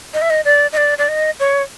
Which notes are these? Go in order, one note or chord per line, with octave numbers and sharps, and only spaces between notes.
D#5
E5
D#5
D5
D#5
D5
D5
D#5
C#5